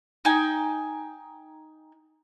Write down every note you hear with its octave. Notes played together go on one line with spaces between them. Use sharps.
D#4 G5 G#5